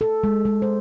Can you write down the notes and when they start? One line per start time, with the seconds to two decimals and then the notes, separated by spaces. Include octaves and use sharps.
0.01 A4
0.24 G#3
0.45 G#3
0.62 C5